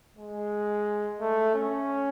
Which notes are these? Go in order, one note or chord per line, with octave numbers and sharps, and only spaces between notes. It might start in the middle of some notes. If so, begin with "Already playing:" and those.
G#3
A3
C#4